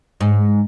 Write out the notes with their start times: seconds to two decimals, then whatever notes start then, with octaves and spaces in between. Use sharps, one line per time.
0.21 G#2